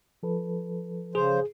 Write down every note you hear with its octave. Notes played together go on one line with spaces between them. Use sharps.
F3 A4 B4
C#3 G#4 C5